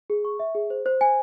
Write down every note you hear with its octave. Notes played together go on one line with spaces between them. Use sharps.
G#4
C#6
E5
G#4
C5
C5
G#5